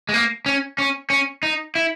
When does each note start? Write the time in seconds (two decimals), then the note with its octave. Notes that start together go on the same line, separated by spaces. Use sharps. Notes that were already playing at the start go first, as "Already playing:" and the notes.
0.09 G#3
0.14 A#3
0.46 C#4
0.78 C#4
1.10 C#4
1.43 D#4
1.75 E4